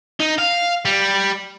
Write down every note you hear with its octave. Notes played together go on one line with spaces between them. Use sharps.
D#4
F5
G3